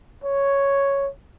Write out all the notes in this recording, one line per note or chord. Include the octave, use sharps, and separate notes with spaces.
C#5